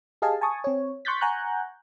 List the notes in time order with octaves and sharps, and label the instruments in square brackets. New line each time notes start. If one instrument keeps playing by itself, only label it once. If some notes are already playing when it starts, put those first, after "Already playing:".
[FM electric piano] G4 G#4 D#5 F5 G#5 A5
G#5 A5 C#6 D#6
C4 C#5
C6 C#6 F#6 G6 A6 B6
F#5 G#5 A#5 C#6 F#6 G6